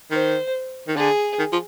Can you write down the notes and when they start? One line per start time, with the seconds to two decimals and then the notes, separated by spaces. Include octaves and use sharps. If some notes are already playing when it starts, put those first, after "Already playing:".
0.11 D#3 C5
0.88 D#3
0.96 D3 G#4
1.38 D#3
1.52 F3